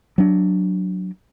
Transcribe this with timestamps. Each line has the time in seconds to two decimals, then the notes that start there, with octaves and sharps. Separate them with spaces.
0.18 F#3 D4